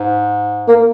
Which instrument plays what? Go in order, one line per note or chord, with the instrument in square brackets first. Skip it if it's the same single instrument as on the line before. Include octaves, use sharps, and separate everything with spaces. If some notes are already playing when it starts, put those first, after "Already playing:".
Already playing: [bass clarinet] G#2
[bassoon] A#3